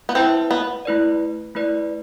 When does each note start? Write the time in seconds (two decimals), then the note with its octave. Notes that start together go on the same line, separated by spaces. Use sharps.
0.09 B3
0.15 C4 E4 B4 E5 A5
0.51 B3
0.85 A3 E4 B4 D5
1.55 A3 E4 B4 D5